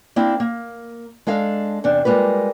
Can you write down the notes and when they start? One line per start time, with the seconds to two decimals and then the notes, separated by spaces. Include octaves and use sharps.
0.16 A#3 C4 D4 E4
0.40 A#3
1.27 G#3 D4 A4 F5
1.84 E2 C3 D4
2.05 G3 G#3 A#3 F4 B4